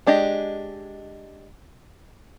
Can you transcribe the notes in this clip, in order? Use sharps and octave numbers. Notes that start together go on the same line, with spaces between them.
G#3 D4 G4 D#5